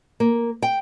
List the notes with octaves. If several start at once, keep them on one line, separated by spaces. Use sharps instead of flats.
A#3
G5